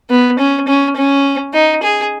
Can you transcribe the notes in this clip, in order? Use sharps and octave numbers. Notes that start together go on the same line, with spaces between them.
B3
C#4
C#4
C#4
D#4
G#4